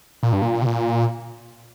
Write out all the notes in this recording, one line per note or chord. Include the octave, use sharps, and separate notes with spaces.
A#2
G2
A#2
C3
A#2